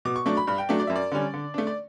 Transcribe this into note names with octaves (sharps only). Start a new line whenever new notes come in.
B2 D6
C#6
F#3 A3 D4 C#6
B5
G2 B5
G5
F#3 A3 D4
D5
F#2 E5
D5
D3 G3 C#4
D3
A3 D4
D5